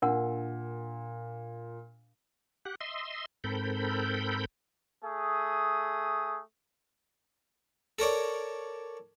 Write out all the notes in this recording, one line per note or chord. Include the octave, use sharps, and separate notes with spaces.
A#2 D4 A#4 F#5
G4 F#5
D#5 E5 C6
G#2 C4 A4 A#4 B5 G6
A3 G#4 D#6
A4 A#4 C#5 D5